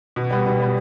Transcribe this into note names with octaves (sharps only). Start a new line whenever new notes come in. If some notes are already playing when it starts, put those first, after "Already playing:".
B2
G3 B3
B2
G3 B3